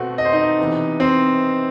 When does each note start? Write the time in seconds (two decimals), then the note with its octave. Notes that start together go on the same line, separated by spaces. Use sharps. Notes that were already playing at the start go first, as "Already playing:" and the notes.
Already playing: B2 A3 C4 F#4
0.18 D#5
0.25 C5
0.33 D#4 D#5
0.59 C3 E3 B3
1.00 C4 C5